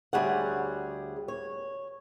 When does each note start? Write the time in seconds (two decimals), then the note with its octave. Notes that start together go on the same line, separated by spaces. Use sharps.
0.13 D2 G3 G#4 C#5 F#5
1.28 C#5